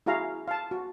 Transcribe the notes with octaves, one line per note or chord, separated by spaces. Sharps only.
E4 F#4 G#4 F5 A#5
F5 A5
F#4